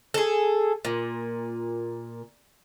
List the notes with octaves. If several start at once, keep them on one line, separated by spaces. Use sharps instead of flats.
G#4 A4
A#2